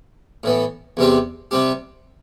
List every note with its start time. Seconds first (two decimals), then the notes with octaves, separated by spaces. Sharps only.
0.44 A2 E3 B3
0.97 E2 C3 G3 C4 G4
1.51 C3 G3 C4 G4